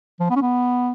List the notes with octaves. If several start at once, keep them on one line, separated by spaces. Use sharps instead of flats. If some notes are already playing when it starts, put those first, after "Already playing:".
F3
B3
C#4
B3